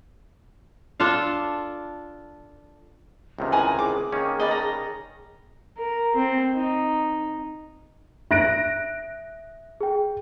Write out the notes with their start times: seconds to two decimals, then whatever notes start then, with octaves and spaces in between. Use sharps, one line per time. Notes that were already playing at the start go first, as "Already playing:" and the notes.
1.00 D4 F4 A4 F5
3.39 C#2 C3 D#3
3.52 E4 B4 G#5 A#5
3.79 G#4 D6
4.12 D#3 A#3 C#4
4.40 B4 D5 D#5
4.51 A#5
5.78 A#4
6.15 C4
6.54 D#4
8.31 E5 F#6 A#6 D7
9.81 G#4 G5